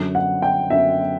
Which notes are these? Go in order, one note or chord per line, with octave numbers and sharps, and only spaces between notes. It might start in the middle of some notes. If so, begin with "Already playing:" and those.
Already playing: F#2 D3 F#3
F#5
G5
F#2 D3 F#3 E5